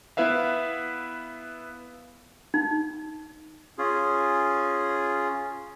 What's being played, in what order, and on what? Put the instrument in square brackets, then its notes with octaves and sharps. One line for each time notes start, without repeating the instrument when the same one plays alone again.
[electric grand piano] B3 E4 B4 E5 F5
[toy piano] D#4
[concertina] C#4 F4 G#4